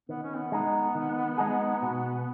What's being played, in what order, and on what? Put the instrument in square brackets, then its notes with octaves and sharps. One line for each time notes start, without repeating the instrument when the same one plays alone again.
[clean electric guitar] D#3 [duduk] B3
[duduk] C#4
B3
[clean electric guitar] G#3 D#4 G#4
D#3
G#3 D#4 G#4
B2